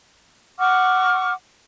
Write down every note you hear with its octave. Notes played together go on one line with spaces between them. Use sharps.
F#5 C#6 D6 F6